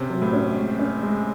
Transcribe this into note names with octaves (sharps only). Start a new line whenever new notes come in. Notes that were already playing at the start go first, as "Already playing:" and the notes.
Already playing: C3 C#4
F#3
A2
C#4
G#3
C#4
G#3